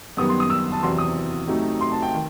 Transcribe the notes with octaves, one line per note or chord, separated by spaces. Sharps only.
F#2 D#3 G3 B3 D#6
C6
D#6
E6
A5
E2 C3 F#3 C6
D#6
C3 F#3 A3 D#4
C6
A5
G5
D#3